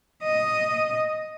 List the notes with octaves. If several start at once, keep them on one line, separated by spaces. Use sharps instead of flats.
D#5